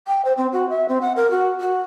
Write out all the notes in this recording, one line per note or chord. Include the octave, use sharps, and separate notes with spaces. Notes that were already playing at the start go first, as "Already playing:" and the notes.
G5
C5
C4
F#4
E5
C4
F#5
A#4
F#4
F#4